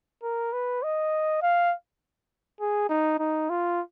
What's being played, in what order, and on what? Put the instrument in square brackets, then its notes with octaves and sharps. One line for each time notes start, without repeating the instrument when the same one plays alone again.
[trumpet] A#4
B4
D#5
F5
G#4
D#4
D#4
F4